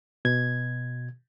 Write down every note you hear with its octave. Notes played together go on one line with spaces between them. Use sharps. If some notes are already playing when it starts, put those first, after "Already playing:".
B2 G#6